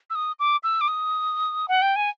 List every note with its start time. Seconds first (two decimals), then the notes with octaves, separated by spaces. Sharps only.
0.10 E6
0.15 D#6
0.39 D6
0.63 E6
0.81 D6
0.88 D#6
1.68 F#5
1.82 G5
1.96 G#5